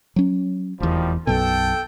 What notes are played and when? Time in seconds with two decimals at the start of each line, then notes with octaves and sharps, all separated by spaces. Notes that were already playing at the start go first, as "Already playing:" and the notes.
0.16 F#3 C#4
0.80 F1 E2 D#3 F3 G3
1.27 B1 F#2 B2 A4 G5